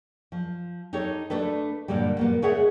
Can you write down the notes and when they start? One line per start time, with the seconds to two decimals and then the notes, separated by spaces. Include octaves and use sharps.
0.32 F3
0.93 D#4 G4 A4 C#5
1.30 A3 D4 A4 B4
1.88 G2 A#2 D3 G3
2.17 A#2 A#3 B3
2.42 C#3 G#3 G#4 C#5 E5 F#5